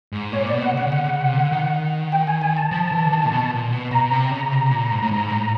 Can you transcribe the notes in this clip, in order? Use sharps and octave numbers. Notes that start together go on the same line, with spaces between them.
G#2
A#2 C#5
B2 D5
F#5
C#3 F#5
C#3
D3 F#5
C#3
C3
D3
D#3
G5
G#5
G#5
A5
F3
E3
D3
D#3
A#2
B2
A#2
B2
B2 A#5
C3
C#3
C3
A#2
G#2
A2
G#2
A2